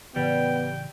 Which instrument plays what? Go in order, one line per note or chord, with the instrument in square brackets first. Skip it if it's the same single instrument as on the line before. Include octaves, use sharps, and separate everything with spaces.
[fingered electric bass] A2 C#3 E3 [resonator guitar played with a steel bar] G3 [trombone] B3 [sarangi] G5